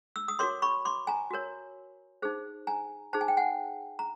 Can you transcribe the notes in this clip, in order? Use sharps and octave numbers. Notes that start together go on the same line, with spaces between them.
E6
D#6
F#4 A#4 C#5 C6 D6
B5 C#6
C6 D6
G#5 A#5
F#4 A#4 C#5
D#4 G#4 C5
G#5 A#5
D#4 G#4 C5 A5
G#5
G5
F#5 G#5
A#5